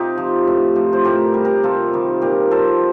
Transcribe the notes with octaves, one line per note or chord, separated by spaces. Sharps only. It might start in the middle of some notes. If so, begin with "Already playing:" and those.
Already playing: C3 D#4 F4 G4
F3
A2
F3
C5
A2 G4 A#4
G3
G4 A#4
C3 F4 A4
D#3 G3
A#2 G4 A#4
F3 A4 C5